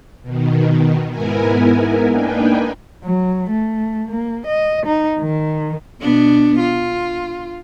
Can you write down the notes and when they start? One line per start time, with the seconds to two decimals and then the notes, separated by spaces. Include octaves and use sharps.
0.23 B2 D#3
1.11 G#2 B3 E4 A#4 G#5
2.10 A#3 D4 D#4 B4 G5 G#5
3.04 F#3
3.50 A3
4.09 A#3
4.47 D#5
4.87 D#4
5.20 D#3
6.01 B2 B3 D4
6.59 F4